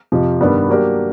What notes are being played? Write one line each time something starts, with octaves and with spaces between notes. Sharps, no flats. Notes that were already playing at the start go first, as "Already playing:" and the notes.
F2 C3 F3
G2 D#3 G3 B3 D4
F#3 A#3 D4 G4